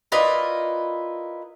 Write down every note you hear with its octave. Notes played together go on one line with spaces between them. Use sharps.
E4 F4 A#4 B4 D5 D#5